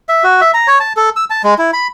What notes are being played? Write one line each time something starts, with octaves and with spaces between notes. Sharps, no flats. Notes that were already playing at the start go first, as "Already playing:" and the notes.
E5
F#4
E5
A#5
C#5
A5
A4
E6
A5
G#3
E4
B5